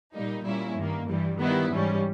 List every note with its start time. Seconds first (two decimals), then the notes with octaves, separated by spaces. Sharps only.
0.14 A#2 G3 A#3 D#4
0.45 A#2 G3 A#3 C#4 E4
0.77 G2 D#3 A#3
1.08 G2 E3 G3
1.40 D#3 G3 B3 E4
1.71 G#2 E3 G3 C#4